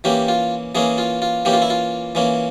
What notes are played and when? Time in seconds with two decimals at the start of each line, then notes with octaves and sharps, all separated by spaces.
0.04 E3 A#3 C#4 G4
0.28 F4
0.75 E3 A#3 C#4 G#4
0.98 F4
1.22 F4
1.45 E3 A#3 C#4 G4
1.53 F4
1.62 E4
1.70 F4
2.15 E3 A#3 C#4